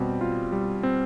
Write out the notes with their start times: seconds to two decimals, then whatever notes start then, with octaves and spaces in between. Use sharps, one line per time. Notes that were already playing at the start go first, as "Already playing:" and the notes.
Already playing: B2 G3 C4
0.21 F4
0.52 G3
0.83 C4